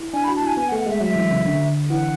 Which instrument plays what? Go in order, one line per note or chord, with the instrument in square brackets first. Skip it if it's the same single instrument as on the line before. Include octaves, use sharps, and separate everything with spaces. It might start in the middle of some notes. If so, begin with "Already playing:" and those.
Already playing: [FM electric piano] E4
[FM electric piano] D4 [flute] G#5
[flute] B5
[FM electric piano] F#4
[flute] A5
[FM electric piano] E4 [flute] G#5
[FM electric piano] B3 [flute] G#5
[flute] F#5
[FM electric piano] A3
[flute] F#5
[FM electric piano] G#3 [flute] E5
[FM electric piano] F#3 [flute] E5
[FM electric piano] E3
C#3
D3
[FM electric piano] E3 [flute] F#5